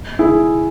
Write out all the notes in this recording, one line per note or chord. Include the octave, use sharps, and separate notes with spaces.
E4 G#4